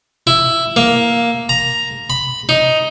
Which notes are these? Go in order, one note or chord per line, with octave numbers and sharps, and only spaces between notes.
E4
A#3
A#5
B5
D#4